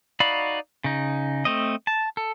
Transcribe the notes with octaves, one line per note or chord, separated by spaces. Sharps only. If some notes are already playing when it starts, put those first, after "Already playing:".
D#4 F#4 D5 F5 B5
C#3 D#4
A3 C4 D#5
A5
A4